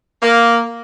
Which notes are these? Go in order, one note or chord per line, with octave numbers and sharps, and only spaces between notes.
A#3